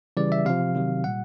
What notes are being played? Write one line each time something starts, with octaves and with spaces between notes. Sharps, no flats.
C#3 E3 G3 D5
E5
C3 F3 F5
C3 D#3 F#3
A#2 G3 F#5